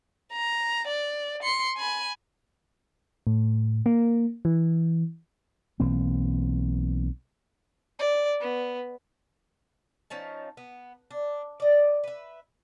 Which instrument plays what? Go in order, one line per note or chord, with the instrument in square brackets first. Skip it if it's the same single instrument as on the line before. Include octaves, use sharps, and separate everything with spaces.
[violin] A#5
D5
C6 C#7
G#5 B5
[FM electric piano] A2
A#3
E3
[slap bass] B1 E3 A#3 C4
[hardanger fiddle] D5
B3
[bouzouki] F3 C#4 D#4 A5
B3
D4
D5 D#5
B4 E5